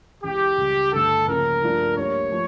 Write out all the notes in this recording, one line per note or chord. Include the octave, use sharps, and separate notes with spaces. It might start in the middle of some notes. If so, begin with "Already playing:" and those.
C#2 C#3 E3 G4
C#2 C#3 G3
G2 D3 A3 A4
C#2 C#3 F3 A#3 C#4 A#4
G2 F3 A3 D4 F4
D2 D3 G3 A#3 C#5
F3 A3